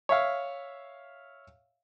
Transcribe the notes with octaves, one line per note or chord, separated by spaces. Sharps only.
C#5 E5 F5